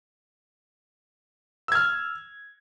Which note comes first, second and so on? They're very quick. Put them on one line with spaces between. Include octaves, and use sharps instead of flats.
E6 G#6 F6